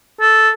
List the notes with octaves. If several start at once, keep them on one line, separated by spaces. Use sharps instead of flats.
A4